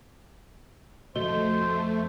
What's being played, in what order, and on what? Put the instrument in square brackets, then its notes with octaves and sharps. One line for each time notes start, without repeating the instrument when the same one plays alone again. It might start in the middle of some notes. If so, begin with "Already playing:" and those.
[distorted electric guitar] C2 F2 [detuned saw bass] A3 [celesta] F#4 D#5 G7 [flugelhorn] C5